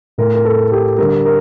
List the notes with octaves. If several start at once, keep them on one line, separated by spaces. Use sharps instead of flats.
A2 A3 A#4
A#4
A4
G4
D3 G3 A#4
A#4